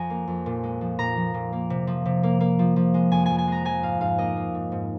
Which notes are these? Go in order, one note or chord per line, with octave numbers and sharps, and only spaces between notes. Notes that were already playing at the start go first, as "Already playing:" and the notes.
Already playing: F2 F3 G#5 A#5
A#3
F2
A#2
G#3
F3
A#2 A#5
F3
A#2
A#3
C3
F3
C3
A#3
A#3
F3
F3
G#3
F2 G#5
F2 G#5
G#5
G#3 A#5
F3 G#5
G#2 F5
G#2 F5
A#3 D#5
A#3
G#2
G#2